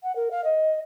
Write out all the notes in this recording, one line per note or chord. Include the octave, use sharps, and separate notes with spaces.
F#5
A#4
F5
D#5